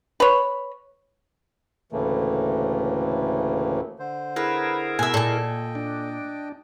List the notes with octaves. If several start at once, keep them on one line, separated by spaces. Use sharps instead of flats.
B4 C#5
D2 A2 C#3 E3 A3 A#3
D3 C5
E4 G#4 A#4 B4
B2 E5 G#5
A#2 A4 D#5 G5 G#5
D4